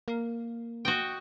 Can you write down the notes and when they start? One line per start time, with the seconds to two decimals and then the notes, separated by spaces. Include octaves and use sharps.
0.08 A#3
0.85 F#4 D#5 G5